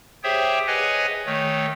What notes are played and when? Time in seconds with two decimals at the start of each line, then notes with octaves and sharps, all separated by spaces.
0.23 G4 G#4 C5 C#5 E5 G5
0.67 G#4 B4 C#5 D#5 F#5 G#5
1.26 D#3 A3 C#5